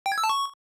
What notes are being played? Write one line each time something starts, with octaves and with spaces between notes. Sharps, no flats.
G5
G#6
E6
A5
C#6